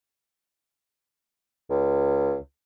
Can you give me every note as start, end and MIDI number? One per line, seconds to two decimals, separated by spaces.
1.70 2.36 37